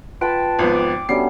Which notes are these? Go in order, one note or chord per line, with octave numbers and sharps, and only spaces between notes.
F4 B4 G5 A5 B5 C6 D7
G#1 F3 B3
D6
F#3 G3 A3 B3 C#4 D4 C7